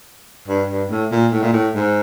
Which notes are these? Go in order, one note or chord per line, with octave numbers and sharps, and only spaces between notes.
G2
G2
A2
A#2
A2
A#2
A2
G#2